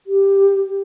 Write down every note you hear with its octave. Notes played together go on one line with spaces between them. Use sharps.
G4